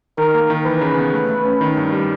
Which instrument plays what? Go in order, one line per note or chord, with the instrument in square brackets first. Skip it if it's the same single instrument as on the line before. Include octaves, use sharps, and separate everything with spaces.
[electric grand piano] D#3 [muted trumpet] A#4
[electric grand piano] A#3
D#3
[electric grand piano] E3 [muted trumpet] B4
[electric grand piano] C#3
B3
A3
A3
C#4
D#3
G2
G3